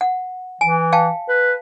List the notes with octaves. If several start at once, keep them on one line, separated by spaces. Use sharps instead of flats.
F#5
E3 G#5
F5 G5 A5
B4